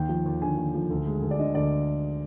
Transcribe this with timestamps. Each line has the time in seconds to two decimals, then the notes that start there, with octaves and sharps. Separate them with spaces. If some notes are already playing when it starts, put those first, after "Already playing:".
Already playing: D#2 G5
0.09 F3
0.26 D#2
0.42 D3 G#5
0.57 D#2
0.74 F3
0.90 D2
1.07 G#3
1.22 D2
1.31 D5
1.39 D3 D#5
1.55 D2 D5